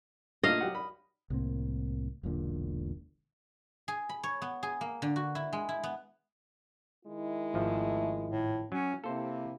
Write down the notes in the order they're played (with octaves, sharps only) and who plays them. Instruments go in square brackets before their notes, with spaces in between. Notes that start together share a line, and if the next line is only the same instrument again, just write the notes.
[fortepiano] A#2 A3 D4 [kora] D#5 F5
[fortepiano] F#3 G4 F#5
B5
[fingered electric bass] C2 A2 A#3 C4
E1 B1 A#2 D3
[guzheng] G#4
B5
C#5
B3
G#4
A#3
D3
F#4
E4
G#3
E4
B3
[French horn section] D#3 G#3 E4
[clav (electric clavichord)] G#1 F3 [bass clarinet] A3
[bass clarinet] A2
[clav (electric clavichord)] F#3 [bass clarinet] C#4
[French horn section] C3 E4 [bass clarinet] A#3 [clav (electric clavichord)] A4 C5